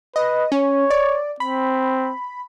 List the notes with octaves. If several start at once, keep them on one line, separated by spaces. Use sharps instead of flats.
B4 D#5
C#4 C#5
D5
C4 B5